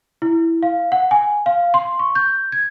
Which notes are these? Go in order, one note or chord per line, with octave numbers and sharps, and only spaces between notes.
E4
F5
F#5
G#5
F5
C6
C#6
G6
G#6